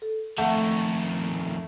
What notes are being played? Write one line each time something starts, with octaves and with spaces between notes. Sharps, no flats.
A4
F2 D#3 A3 F#5